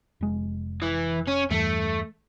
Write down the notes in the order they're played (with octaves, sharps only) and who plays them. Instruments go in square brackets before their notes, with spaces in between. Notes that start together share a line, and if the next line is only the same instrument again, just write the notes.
[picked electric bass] F1 G#3
[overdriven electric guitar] E3
C#4
[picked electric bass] E2 G2 [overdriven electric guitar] A3